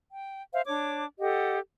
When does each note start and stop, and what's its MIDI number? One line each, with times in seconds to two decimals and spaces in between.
0.12 0.43 79
0.53 0.61 72
0.53 0.61 76
0.53 0.61 77
0.66 1.04 62
0.66 1.04 73
0.66 1.04 86
1.20 1.59 67
1.20 1.59 69
1.20 1.59 75
1.20 1.59 78